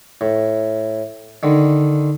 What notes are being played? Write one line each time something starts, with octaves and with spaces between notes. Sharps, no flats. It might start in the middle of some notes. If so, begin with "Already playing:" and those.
A2
D3 D#3